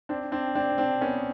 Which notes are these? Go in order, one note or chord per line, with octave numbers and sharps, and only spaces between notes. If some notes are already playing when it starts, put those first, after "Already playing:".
C4 D4
C4 D4
C4 D4
C4 D4
B3 C#4